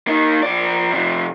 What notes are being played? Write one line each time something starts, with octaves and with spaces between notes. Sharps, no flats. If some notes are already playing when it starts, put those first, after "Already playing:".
A#3 D#4
F3 D5
C3 F3